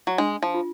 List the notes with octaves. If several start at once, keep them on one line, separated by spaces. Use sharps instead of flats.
F#3
G#3 D4
F3
F4